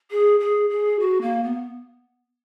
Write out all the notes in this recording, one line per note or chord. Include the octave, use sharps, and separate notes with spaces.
G#4
G#4
G#4
F#4
A#3
B3